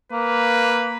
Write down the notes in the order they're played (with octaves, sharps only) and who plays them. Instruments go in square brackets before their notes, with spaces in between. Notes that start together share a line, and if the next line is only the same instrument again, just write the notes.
[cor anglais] A#3 [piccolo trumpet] B4